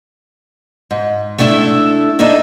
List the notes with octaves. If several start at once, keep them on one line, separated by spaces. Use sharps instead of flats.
G#2
A3 B3 D4 E4 A4 E5
A#3 D4 D#4 A4 E5